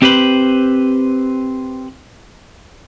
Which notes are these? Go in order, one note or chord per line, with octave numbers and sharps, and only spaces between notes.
C4 G4 B4 C5 B5